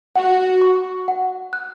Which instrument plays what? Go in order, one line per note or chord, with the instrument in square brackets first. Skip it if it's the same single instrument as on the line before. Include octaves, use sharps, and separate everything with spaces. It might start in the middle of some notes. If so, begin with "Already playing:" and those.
[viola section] F#4 [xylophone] F#5
[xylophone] C#6
F#5
F#6